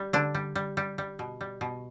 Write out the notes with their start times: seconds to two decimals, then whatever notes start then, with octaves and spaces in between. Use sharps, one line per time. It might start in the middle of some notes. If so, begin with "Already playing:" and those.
Already playing: G3
0.13 D3 D4
0.35 G3
0.55 G3
0.77 G3
0.98 G3
1.19 B2
1.41 G3
1.61 B2